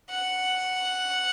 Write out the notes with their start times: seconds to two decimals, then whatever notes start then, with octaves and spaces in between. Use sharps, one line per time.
0.10 F#5